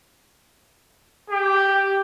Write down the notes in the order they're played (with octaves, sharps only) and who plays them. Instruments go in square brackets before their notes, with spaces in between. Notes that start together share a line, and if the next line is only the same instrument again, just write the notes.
[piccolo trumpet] G4